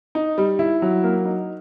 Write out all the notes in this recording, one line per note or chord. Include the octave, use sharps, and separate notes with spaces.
D#4
G3
E4
F#3
A#3
D#4